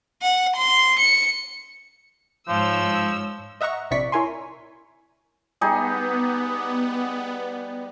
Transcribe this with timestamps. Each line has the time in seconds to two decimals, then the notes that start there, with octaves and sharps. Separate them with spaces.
0.22 F#5
0.56 C6
1.00 C#7
2.48 G#2 F3 C#5 E6
3.61 D#5 E5 F#5 A#5 C#6
3.91 A#1 C3 E4 D5 C#6 B6
4.12 E4 A#4 C#5 G#5 C6
5.61 G3 B3 D#4 G#4